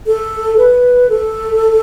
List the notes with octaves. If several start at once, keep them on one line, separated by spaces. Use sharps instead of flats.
A4
B4
A4